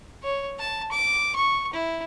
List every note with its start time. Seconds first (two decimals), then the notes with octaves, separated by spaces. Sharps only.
0.23 C#5
0.59 A5
0.92 D6
1.36 C#6
1.73 E4